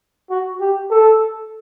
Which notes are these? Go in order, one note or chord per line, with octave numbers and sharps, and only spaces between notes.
F#4
G4
A4